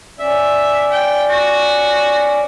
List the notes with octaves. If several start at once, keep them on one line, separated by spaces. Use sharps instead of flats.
C#4 D5 E5
G5
F#4